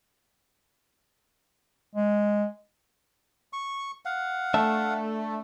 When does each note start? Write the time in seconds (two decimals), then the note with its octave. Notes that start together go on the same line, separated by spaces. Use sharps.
1.96 G#3
3.53 C#6
4.05 F5 F#5
4.54 A3 D4 E5 A5